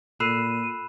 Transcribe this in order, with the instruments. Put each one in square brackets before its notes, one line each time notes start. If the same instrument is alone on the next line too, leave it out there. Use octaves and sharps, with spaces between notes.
[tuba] A#2 [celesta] A4 E6 C7 [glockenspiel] B5 F#6 E7 [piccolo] D#7